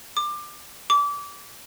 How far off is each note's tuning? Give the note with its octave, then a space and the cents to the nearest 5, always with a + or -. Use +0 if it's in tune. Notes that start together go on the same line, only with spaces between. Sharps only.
D6 +20
D6 -25